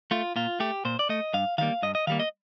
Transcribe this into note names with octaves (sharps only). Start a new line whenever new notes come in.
A3 F4
A#2 F4
A3 G4
A#2 C5
D5
A3 D#5
G2 F5
D#3 G3 A#3 F5
G2 D#5
D#5
D#3 G3 A#3 F5
D#5